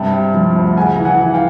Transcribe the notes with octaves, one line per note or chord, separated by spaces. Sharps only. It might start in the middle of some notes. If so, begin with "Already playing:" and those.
Already playing: G2 C3 G5 A5
C3
F3
D2
C#3 F#5 G#5
E3
F#5 G#5
E3
F5 G5